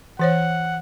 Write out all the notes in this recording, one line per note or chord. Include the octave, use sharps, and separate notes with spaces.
E3 C5 C#5 F#5